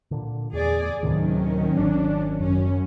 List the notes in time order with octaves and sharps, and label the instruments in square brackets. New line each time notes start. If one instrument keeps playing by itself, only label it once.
[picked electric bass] A#2 D3
[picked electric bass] E2 [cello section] G#4 D5
[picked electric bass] D2 A2 C3 [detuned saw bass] D#3 [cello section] F#3 C#4
[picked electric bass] G#1 D#3 [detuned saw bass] D4
[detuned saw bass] F#2 [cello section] C#4